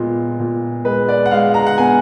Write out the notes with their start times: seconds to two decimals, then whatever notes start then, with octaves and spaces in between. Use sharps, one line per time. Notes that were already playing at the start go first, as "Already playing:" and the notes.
Already playing: A#2 G#3 B3
0.39 A#2
0.85 G#3 B4
1.09 D5
1.26 F#5
1.31 G#3 F5
1.54 A#5
1.67 F#5
1.78 B3 G#5